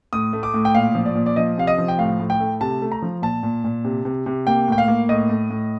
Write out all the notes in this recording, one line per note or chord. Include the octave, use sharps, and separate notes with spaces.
A2 D#6
A3
D6
A2
G5
A#2 F5
F3
D5
A#2
D5
F3 D#5
C3 F5
D#5
F3
G5
A2 F5
A2
G5
A3
C3 A5
A3
A#5
F3
A#2 A5
A#2
A#2
C3
C3
C3
A#3 G5
A2 G5
F5
A#3
A2 D#5
A2
A2